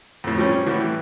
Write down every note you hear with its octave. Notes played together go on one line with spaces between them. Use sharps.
F2 A2
F3 G3 C#4
A2 E3 G3 F#4